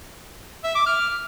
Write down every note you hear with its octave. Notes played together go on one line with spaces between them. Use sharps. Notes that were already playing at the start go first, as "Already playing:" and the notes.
E5
D6
F6